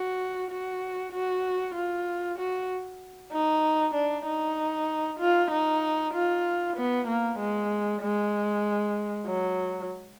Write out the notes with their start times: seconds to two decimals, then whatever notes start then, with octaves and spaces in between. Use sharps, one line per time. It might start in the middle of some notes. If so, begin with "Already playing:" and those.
Already playing: F#4
0.50 F#4
1.12 F#4
1.75 F4
2.38 F#4
3.32 D#4
3.94 D4
4.26 D#4
5.19 F4
5.51 D#4
6.13 F4
6.76 B3
7.07 A#3
7.38 G#3
8.02 G#3
9.27 F#3